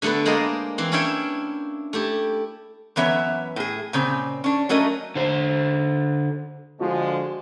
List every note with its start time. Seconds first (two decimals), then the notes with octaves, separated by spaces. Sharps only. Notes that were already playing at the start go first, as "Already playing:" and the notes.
0.02 D3 A3 B3 A4 B4
0.25 G#3 A#3 C5 D5 D#5
0.78 E3 C4
0.92 C#4 D4 E4 C#5 E5 G5
1.93 A3 E4 G4
2.96 F#2 E3 B3 C#5 E5
3.56 A2 G#4
3.93 A#2 C#3 C4
4.44 C#4 D4
4.69 F#3 A3 C#4 A#4 D#5
5.15 D3 C5
6.80 D3 F3 G#3 F#4